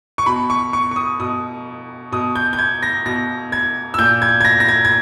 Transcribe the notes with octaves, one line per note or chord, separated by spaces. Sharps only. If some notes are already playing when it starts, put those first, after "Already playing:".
C#6
B2 B5
C#6
C#6
C#6
D#6
B2 D#6
B2 D#6
G6
G6
G#6
A#6
B2 A#6
G#6
E6
A#2 G6
G#6
G#6
A#6
A#6
G#6
G#6